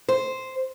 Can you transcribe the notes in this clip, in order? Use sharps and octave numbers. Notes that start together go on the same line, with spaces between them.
C5